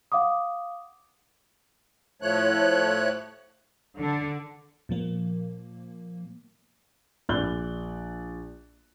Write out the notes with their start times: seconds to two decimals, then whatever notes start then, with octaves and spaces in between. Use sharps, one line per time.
0.12 F5 F#5 D6 D#6
2.22 A2 F3 A3 C#5 F#6
3.98 D3
4.89 A#2 F3 A#3
7.29 A#1 D5 F#6 G7